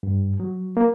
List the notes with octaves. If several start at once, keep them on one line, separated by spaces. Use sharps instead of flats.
G2
F#3
A#3